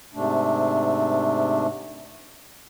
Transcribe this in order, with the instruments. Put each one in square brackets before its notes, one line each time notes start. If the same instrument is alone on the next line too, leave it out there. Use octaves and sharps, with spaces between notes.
[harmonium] G#2 C3 A3 D4